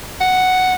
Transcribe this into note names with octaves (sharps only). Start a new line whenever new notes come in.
F#5